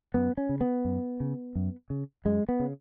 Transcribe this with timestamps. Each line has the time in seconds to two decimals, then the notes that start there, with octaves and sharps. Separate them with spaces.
0.14 F#2 B3
0.37 C#4
0.49 C#3
0.61 B3
0.85 F#2
1.20 C#3
1.55 F#2
1.90 C#3
2.25 F#2 G#3
2.49 B3
2.60 C#3